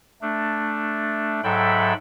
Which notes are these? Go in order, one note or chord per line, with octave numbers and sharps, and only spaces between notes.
A3 D4
G#2 F#3 A4 E5 G5 B5